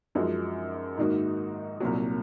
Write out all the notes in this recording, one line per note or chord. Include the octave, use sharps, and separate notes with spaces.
F#2 F3 G#3 D#4 F#4
G#2 D#3 A#3 D#4 F#4
C2 A#2 F#3